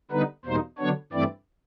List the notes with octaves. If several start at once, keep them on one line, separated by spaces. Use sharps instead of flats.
D3 G3 B3 D#4 B4
E2 B2 G3 A#3 D#4 C5
D3 F#3 B3 D4 C#5
G2 E3 A3 C4 E4 D5